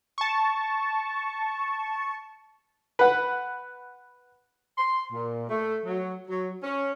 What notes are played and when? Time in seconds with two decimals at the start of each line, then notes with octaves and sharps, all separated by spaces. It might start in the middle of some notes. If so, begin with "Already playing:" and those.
0.18 A5 C#6
2.99 B4 F#5
4.78 C6
5.12 A#2
5.49 A3
5.85 F#3
6.28 F#3
6.63 C#4